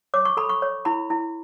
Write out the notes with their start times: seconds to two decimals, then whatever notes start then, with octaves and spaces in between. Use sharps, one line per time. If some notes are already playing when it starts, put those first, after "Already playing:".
0.14 C#5 D6
0.25 C#6
0.37 A4 B5
0.49 C#6
0.62 C#5
0.85 E4 B5
1.10 E4